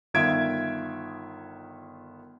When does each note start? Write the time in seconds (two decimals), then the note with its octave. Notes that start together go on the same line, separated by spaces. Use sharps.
0.14 G1 D#3 F4 E5 G#6 D7